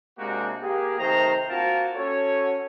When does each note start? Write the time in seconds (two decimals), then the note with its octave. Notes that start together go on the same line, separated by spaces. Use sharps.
0.18 C3 G#3 A#3 D4 F#4 G4
0.62 A#3 G4 G#4
0.99 C3 D#3 A3 C5 A#5
1.48 A#3 C4 F4 F#4 A#4 A5
1.95 C#4 F#4 A4 C#5